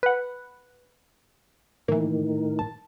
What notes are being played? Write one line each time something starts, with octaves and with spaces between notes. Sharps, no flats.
B4 F#5
A2 D#3 E3 A#3
A5